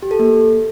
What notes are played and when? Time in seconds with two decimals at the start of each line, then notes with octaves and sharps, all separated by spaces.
0.02 G4
0.11 A4
0.19 A#3